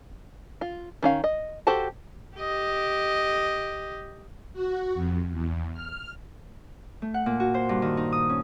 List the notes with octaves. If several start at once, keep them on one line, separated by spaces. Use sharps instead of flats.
F4
D#3 C#4 F5
D#5
F#4 G4 A4 C5 A5
G4 D#5
F#4
F2
E2
F6
A3
F#5
A#2
F#4
C5
G2
D#3
D#4
D#6
C#4